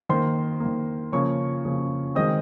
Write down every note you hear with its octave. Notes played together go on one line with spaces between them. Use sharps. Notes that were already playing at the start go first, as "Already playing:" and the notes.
D#3 A#3 C5 C6
D#3 A#3
C#3 F3 A#3 C#5 C#6
C#3 F3 A#3
D#3 G#3 C4 D#5 D#6